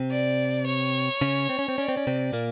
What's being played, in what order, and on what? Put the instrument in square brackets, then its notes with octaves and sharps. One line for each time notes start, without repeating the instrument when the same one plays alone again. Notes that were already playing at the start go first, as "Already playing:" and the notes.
Already playing: [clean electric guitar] C3 C4
[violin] D5
C#5
[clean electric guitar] C#3 C#4
C4
C#4
C4
[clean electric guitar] C#4 [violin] D5
[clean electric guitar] C4
C#4
C3 C4
A#2 A#3